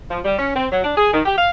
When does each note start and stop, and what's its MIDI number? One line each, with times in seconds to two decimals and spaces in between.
0.10 0.20 53
0.24 0.35 55
0.39 0.50 61
0.55 0.66 60
0.72 0.81 54
0.84 0.94 62
0.97 1.13 68
1.13 1.21 51
1.25 1.38 67
1.38 1.50 77